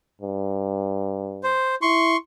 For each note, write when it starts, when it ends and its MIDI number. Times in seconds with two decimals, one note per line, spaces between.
0.22 1.57 43
1.43 1.75 72
1.82 2.16 64
1.82 2.17 84
1.82 2.17 85